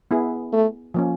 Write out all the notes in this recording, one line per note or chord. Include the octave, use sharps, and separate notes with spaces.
B3 E4 G#4
A3
F3 A#3 C#4